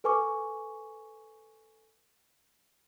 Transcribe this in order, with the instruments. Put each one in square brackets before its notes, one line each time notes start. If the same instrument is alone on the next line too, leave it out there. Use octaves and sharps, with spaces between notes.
[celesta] A4 B4 G#5 C#6 D6